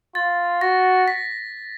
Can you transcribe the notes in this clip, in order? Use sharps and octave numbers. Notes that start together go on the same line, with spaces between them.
F4 A6
F#4 A#6
B6